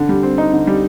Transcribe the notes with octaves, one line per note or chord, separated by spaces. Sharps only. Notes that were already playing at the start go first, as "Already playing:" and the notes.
Already playing: D3
G3
C4
D#4
D3
G3